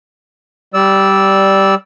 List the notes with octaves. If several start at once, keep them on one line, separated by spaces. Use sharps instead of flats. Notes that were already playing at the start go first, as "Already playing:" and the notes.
G3 D5 E6